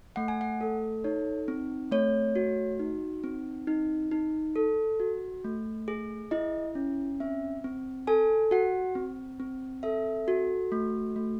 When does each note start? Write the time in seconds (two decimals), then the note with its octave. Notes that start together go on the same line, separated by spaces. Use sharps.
0.16 A3 F#5
0.28 G#5
0.41 F#5
0.61 A4
1.04 D#4 C#5
1.48 C4
1.92 A3 C#5
2.36 F#4
2.80 D#4
3.24 C4
3.67 D#4
4.11 D#4
4.56 A4
5.00 F#4
5.44 A3
5.88 G#4
6.31 E4 D#5
6.75 C#4
7.20 C4 E5
7.64 C4
8.07 A4 G#5
8.51 F#4 F#5
8.95 C4
9.40 C4
9.83 A4 E5
10.28 F#4
10.72 A3
11.16 A3